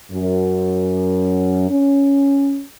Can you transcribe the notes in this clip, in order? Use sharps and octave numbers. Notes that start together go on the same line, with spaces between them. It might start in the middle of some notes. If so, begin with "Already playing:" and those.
F#2
C#4